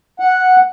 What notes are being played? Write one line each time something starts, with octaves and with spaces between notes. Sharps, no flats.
F#5